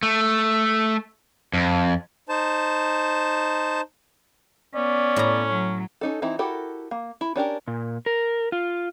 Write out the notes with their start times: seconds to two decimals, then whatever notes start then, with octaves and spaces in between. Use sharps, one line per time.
0.03 A3
1.54 F2
2.29 D#4 C5 A5
4.75 B3 C#4 D5
5.16 A2 A#5
5.48 F#3
6.01 C#4 D#4 A4
6.22 E3 C4 D#4 E4
6.39 E4 F#4 G4 A4 A#4
6.91 A#3
7.21 E4
7.36 C#4 D4 G4 A#4
7.68 A#2
8.06 A#4
8.52 F4